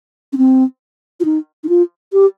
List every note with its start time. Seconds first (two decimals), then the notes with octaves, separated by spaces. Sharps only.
0.33 C#4
0.38 C4
1.20 F4
1.25 D#4
1.64 D#4
1.69 F4
2.13 G4